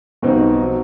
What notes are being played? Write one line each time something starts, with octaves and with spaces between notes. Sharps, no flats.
B1 B2 G3 C4 D#4
F#3